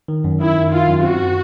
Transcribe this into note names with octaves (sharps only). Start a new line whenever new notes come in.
D#3
F#2
D#3 E4
D#3
D#3 F4
F#2
C4 F#4